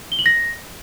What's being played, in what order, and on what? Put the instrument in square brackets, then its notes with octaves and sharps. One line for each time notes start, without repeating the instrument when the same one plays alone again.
[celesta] G7
F#7
A#6